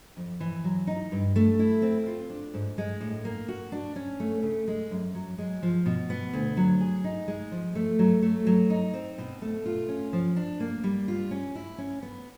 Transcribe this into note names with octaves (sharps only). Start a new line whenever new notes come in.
F2
E3
F#3
D#4
G2
A3
E4
C4
F4
D4
G#2
G#3
A2
A#3
F#4
D4
C#4
A3
C#3
G#3
F#2
F#3
G#3
F3
B2
B3
D2
F#3
G#4
D#4
G#3
F3
A3
F#3
A3
F#3
D#4
C4
B2
A3
F4
C#4
F3
D4
A#3
G3
F4
C#4
E4
C#4
B3